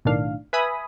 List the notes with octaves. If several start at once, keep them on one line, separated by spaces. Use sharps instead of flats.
B1 A2 D#3 D4 F5
B4 E5 G#5 B5 D#6